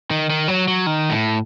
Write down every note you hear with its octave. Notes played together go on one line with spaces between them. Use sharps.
D#3
D#3
F#3
F#3
D#3
A2